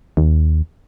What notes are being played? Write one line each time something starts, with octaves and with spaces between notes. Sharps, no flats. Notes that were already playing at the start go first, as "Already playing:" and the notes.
D#2